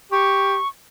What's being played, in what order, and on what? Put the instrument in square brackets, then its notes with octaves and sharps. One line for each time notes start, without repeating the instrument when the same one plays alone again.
[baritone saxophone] G4 [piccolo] C#6